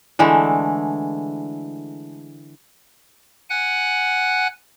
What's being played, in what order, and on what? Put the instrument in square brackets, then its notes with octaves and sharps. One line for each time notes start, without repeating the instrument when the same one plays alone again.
[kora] D3 E3 G#3 A3
[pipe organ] F#5 G#5 F#6